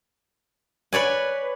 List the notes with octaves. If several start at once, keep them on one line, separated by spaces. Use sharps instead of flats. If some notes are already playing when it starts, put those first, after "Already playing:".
B4 C#5 D5 G#5